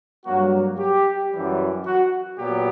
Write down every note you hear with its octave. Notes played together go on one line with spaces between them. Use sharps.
G2 F#3 A#3 F#4
G4
F#2 E3 G3
F#4
A#2 F#3 B3 G4